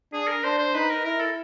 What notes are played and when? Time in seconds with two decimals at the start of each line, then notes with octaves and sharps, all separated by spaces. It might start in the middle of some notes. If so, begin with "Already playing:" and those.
0.12 D4 G#4
0.27 A#4
0.43 D4 C5
0.59 C5
0.74 D#4 B4
0.90 A#4
1.04 E4 A#4
1.20 A4